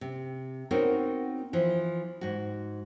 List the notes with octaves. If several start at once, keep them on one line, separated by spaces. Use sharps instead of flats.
C3
B3 C4 D#4 F#4 A#4 C#5
E3 F3
G#2 F#4